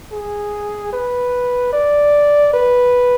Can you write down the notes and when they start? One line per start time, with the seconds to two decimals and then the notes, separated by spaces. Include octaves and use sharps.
0.12 G#4
0.93 B4
1.73 D5
2.54 B4